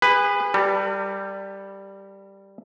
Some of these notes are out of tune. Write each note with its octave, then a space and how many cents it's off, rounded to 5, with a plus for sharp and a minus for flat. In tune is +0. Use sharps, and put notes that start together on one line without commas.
G#4 -30 B4 +5
G3 +0 A#4 -45 A5 +40